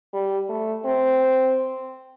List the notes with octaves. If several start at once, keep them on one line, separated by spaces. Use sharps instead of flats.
G3
A3
C4